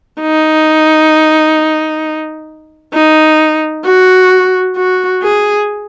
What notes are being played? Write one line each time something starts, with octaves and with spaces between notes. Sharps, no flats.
D#4
D#4
F#4
F#4
G#4